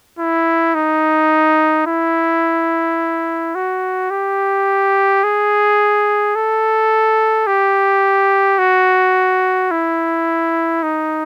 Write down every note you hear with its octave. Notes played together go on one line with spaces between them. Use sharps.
E4
D#4
E4
F#4
G4
G#4
A4
G4
F#4
E4
D#4